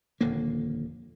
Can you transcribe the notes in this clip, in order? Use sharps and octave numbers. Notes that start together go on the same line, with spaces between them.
D#1 F2 D3 A#3